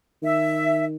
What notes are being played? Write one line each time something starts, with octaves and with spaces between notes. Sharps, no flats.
D#3 E5